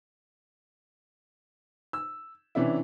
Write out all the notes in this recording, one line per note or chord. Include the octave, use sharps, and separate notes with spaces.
E6
C3 E3 C#4 D4 E4